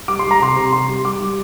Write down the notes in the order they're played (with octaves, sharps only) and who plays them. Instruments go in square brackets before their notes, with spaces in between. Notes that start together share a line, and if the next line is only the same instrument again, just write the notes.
[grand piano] G3 D6
G3 C6
A#5
C3 C6
C3
C3 C6
G3
G3 D6
G3